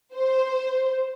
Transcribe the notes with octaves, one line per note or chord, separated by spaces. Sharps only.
C5